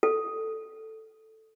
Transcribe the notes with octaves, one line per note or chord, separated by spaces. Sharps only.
A4